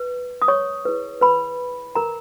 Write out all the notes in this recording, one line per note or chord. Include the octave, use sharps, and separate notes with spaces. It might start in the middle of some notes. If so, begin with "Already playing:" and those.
Already playing: B4
D#6
C#5 C#6
E4 G#4 B4
B4 B5
A#4 A#5